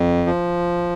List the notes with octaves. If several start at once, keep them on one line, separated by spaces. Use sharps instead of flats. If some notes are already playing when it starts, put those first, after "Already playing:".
Already playing: F2
F3